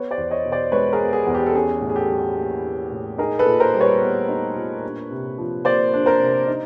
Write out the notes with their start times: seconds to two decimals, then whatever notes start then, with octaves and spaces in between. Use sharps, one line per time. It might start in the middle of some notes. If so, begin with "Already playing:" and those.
Already playing: B3 B4 C#5
0.11 C5 D5
0.17 E2
0.31 C#5 D#5
0.45 B2
0.52 C5 D5
0.72 G#3 B4 C#5
0.93 G#4 A#4
1.00 B3
1.13 G#4
1.27 E2
1.35 G4
1.47 A4
1.55 C#4 G#4
1.81 A2
1.90 G#4
1.96 G4 A4
2.10 F#3
2.37 A#3
2.64 C#4
2.92 A2
3.18 D#4 G#4 A#4
3.39 A4 B4
3.46 A#2
3.60 A#4 C5
3.74 G3
3.81 B4 C#5
4.01 B3
4.29 D#4
4.55 A#2
4.84 D4
5.11 C3
5.38 F3
5.65 A#3 C5 D5
5.93 D4
6.06 A#4 C5
6.20 C3
6.47 D#4